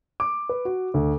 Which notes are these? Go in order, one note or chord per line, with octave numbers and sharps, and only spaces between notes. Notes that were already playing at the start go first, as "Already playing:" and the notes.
D6
B4
F#4
D2